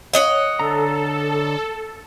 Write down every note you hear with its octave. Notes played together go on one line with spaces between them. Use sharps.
C#5 D#5 F#5
D3 A4 A#5